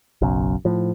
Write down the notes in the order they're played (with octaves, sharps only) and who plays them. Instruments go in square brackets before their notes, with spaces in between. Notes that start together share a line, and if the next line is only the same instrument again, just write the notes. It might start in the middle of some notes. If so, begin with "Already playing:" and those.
[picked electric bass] F#1 B1 F#2
A2 F3